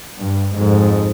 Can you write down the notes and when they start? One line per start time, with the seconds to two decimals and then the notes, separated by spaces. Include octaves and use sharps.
0.22 G2
0.57 F2 G#2